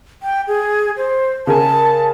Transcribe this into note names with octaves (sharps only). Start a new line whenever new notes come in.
G5
G#4
C5
C#3 A#4 G#5 A5